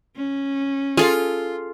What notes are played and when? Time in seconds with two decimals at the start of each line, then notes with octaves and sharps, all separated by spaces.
0.16 C#4
0.97 F4 G#4 A4 F5